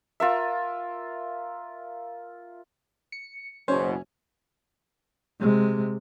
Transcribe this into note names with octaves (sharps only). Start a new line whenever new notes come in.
F4 A#4 E5
C#7
F#1 B2 E3 C#4 C5 C#5
C3 G#3